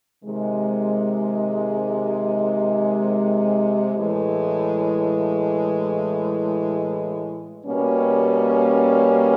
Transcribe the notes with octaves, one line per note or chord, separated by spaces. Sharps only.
C3 D#3 G#3
A2 E3 G#3
B2 G3 A#3 C#4